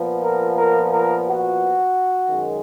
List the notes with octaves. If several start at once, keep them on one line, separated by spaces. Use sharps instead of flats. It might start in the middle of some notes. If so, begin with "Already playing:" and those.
Already playing: A#2 F3 B3
A#4
A#4
A#4
F#4
F#2 D#3 G#3